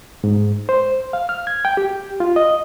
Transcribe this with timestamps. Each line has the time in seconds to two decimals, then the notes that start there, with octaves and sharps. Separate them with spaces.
0.24 G#2
0.69 C5
1.13 F5
1.29 F6
1.47 G#6
1.65 G5
1.77 G4
2.20 F4
2.36 D#5